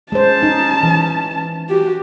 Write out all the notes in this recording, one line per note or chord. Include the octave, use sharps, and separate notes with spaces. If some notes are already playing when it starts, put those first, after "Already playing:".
G#3 C#4 C5 A5
D#4
E3
F#4 G4